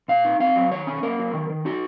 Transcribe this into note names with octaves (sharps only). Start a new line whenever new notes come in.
A#2 F5
D#4
C4 F5
F#3
D#3 C#5
C#4
A#3 A#4
F#3
D#3
D#3
D#4 F#4